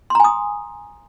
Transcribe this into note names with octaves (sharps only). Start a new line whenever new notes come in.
G#5 A#5 C6 D#6